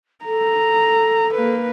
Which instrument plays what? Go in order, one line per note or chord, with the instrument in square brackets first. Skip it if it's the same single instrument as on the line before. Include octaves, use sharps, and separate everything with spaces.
[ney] A4 [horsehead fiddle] A#5
[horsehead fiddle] A#3 B4